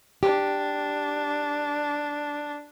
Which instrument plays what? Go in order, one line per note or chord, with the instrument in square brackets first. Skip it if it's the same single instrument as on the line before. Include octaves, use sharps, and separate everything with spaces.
[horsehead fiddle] D4 [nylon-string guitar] G4